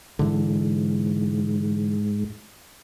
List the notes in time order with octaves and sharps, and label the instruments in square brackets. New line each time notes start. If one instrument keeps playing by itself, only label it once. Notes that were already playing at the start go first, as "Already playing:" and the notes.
[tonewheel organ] G#2 [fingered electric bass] D3 E3